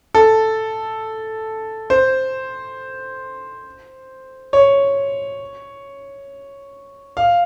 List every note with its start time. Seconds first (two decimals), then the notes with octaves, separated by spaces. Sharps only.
0.15 A4
1.90 C5
4.53 C#5
7.17 F5